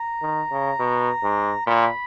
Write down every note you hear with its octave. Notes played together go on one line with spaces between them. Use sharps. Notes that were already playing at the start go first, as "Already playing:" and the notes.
Already playing: A#5
D#3
C#3
B2
G#2
A#2 B5